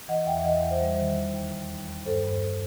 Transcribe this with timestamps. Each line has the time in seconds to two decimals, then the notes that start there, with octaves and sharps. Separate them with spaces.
0.08 E3 D#5 F#5
0.26 E2 E5 G5
0.44 E3 D#5 F#5
0.62 E2
0.71 C5 E5
0.81 G3
0.98 D#3
1.16 D#2
1.34 D#2
1.52 D#2
1.70 D#2
1.88 D#2
2.06 G2 A4 C5
2.24 G2